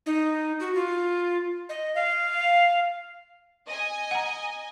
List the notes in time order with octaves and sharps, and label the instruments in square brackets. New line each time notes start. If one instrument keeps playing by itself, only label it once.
[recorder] D#4
F#4
F4
D#5
F5
[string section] D#5 G#5
[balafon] F#5 A#5